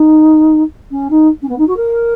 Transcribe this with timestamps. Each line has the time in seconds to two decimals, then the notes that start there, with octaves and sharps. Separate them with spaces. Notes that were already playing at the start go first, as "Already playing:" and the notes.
Already playing: D#4
0.91 C#4
1.10 D#4
1.42 C#4
1.49 B3
1.58 D#4
1.67 F#4
1.76 A#4